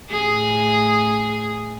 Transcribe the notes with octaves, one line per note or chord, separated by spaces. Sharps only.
A2 G#4